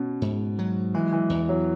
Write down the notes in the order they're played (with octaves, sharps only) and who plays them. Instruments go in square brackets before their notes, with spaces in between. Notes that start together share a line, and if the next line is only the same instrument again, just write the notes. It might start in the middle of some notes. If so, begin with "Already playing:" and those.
Already playing: [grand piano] B2 [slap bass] C#4
[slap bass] G#2
F#3
[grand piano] E3 [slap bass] G#3
[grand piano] E3
[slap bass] E2
[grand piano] F#3